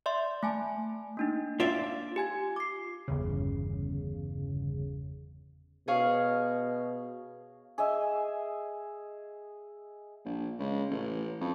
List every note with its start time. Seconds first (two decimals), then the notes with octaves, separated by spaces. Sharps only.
0.06 D5 E5 C6
0.43 A3 G#5 A5
1.17 A#3 D4 D#4
1.60 F4 D5 E5
2.16 G4 G#5 G#6
2.56 D6 C7
3.08 G1 E2 C#3
5.88 B2 G#4 C#5 F5
7.78 G#4 D#5 E5
10.25 A#1
10.59 C#2
10.90 A1
11.41 F2